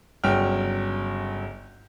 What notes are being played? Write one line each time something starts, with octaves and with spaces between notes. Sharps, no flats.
G1 C#3 F#3 G5 F6